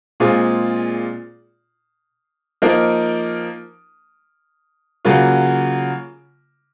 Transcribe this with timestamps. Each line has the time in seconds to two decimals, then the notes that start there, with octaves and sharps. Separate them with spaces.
0.20 A#2 G#3 C4 F4 G#4
2.62 F3 A#3 D#4 A#4
5.05 C#3 F#3 A#3 F4